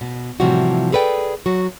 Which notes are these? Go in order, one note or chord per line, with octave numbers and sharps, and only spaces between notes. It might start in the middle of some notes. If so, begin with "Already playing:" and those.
B2
A2 C3 E3 F3 G3 F#4
G#4 A4 B4 D5 G5
F#3 F#4